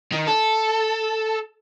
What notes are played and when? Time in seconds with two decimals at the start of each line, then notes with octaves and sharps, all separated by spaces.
0.12 D#3
0.27 A4